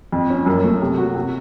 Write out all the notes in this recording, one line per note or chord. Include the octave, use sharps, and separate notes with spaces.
F2
C#4
F#2
A3
C3
F#4
C3